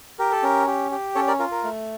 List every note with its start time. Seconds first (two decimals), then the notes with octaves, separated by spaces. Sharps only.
0.19 G4 A#4
0.32 A4
0.43 C#4 A#4
0.67 G4
0.91 G4
1.15 C#4 A4 C#5
1.28 A#4 D5
1.39 F4 A#4
1.52 A#4
1.64 A3